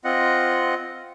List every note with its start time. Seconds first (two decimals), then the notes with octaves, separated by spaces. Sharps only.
0.05 C4 F4 D#5 F#5